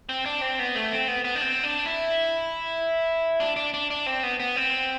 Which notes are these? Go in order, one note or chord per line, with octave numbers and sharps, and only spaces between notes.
C4
D4
C4
B3
A3
C4
B3
B3
D4
C4
D4
E4
D4
D4
D4
D4
C4
B3
B3
C4